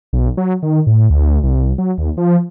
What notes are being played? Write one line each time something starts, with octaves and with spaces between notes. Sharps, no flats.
B1
F#3
D#3
A2
D2
C2
F#3
D#2
F3